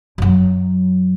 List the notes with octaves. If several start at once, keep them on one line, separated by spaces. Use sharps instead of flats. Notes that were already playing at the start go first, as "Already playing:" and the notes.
F#2 F#3